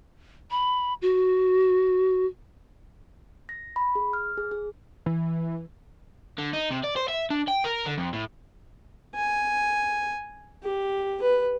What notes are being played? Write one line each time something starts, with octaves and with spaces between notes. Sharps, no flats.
B5
F#4
A#6
B5
G#4
F6
G#4
G#4
E3
D3
D#4
C3
D5
C5
E5
D4
G5
A#4
D3
F2
A2
G#5
G4
B4